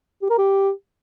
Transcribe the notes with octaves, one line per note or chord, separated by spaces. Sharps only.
G4
A#4
G4